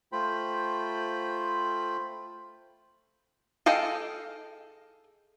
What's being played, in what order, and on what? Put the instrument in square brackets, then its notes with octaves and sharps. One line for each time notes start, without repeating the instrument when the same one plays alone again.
[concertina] A3 F4 C5 G5 B5
[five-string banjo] G#4 A4 D#5 F5 G5